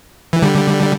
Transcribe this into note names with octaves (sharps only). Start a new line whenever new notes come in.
E3
D3 G3